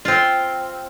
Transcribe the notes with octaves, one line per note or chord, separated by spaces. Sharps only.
C4 F4